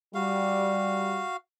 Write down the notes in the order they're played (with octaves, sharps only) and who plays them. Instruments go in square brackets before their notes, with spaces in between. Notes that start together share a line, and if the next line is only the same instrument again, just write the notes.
[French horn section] G3 [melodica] F#4 F5